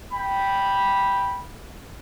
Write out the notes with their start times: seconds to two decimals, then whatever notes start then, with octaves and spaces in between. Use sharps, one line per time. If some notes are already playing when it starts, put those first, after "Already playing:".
0.12 G5 B5